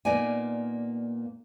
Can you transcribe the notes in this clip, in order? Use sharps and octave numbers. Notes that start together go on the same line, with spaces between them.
A#2 A#3 B3 D#4 D5 G#5